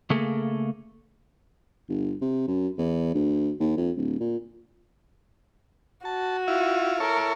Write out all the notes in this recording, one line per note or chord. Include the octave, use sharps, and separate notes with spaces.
C#3 A3 A#3 G#4 A4
G1
C3
F#2
E2
D2
D#2
F2
D1
A#2
F#4 A5
E4 F4
E4 A4 A#4 C#5